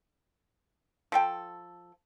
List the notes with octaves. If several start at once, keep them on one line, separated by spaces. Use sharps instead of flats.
F3 A4 G5